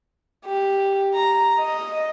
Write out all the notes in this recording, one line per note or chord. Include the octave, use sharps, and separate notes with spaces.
G4
A#5
D#5